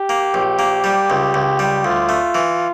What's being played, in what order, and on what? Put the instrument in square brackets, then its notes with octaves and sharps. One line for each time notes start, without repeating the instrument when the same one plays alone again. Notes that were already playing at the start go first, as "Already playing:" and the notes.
Already playing: [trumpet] G4
[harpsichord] A#3
A#1
A#3
G3
C#2
C#2
G3
[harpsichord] D2 [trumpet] F4
[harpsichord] A3
E3